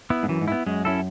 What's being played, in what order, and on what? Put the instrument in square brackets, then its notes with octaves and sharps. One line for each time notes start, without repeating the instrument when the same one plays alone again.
[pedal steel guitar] B3 E4
[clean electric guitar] G#2
[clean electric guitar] F#2 [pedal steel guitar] E3
[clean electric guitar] G#2
[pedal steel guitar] B3 E4
[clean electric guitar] F#2 [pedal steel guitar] G#3
[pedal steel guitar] C#4 E4 A4